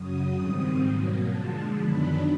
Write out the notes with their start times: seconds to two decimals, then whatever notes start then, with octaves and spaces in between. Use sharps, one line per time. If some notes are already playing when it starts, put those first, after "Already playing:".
Already playing: F#2 C#3 F#3 D#6
0.37 G#2 D#3 G3 C4
0.83 B2 F#3 A#3
1.29 D3 F3 G#3 A5
1.75 F#2 D#3 F#3 B3 D4 B5